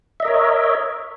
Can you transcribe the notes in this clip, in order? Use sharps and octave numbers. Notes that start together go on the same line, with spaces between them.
A#4 C#5 D#5 E5